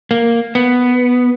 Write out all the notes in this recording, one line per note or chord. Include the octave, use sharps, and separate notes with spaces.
A#3
B3